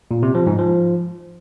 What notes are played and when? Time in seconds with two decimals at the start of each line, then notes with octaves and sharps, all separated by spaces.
0.11 A#2
0.23 C3
0.35 F3
0.47 G#2
0.59 F3